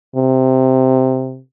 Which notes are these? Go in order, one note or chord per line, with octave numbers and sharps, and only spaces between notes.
C3